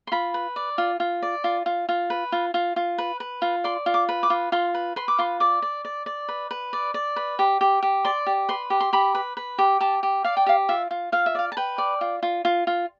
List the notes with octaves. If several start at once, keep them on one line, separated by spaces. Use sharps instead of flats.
C6
F4 B5
B4
D5
F4
F4
D5
F4
F4
F4
B4
F4
F4
F4
B4
B4
F4
D5 C6
F4
D6
B4
D6
F4
F4 C6
B4
B4 C6
D6
F4 C6
D5 D6
D5
D5
D5
B4
B4
D5
D5
B4
G4
G4
G4
D5 C6
G4
B4 C6
G4
C6
G4 B5
B4
B4
G4
G4 A5
G4
D5 F5
G5
G4 F5
F4 E5
F4
F4 F5
E5
D5 F5
A5
B4 G5
D5
F4
F4
F4
F4